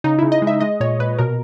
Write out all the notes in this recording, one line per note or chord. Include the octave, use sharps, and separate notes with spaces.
C#3 D#4
C#3 E4
D#5
G#3
E5
G#3 D#5
A#2 C#5
A#2 B4
B2 A#4